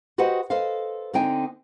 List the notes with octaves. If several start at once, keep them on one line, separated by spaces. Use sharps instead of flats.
F#4 G4 B4 C5 D#5 F#5
A4 B4 C5 D#5 F5
D3 C4 D#4 G5 G#5